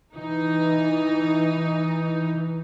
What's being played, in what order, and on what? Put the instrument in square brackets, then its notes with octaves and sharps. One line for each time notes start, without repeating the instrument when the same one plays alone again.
[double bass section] E3 [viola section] D#4